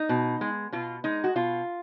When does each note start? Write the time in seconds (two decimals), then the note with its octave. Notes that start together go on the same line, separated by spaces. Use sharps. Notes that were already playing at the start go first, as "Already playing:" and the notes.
Already playing: D#4
0.09 B2
0.41 G#3
0.72 B2 F4
1.04 G#3 D#4
1.24 F#4
1.36 B2 F4